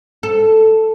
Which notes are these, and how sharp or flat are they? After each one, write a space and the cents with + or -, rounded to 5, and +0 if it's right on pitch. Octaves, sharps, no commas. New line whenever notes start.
A4 +0